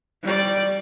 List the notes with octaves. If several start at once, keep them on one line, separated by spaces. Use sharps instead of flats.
G3 D5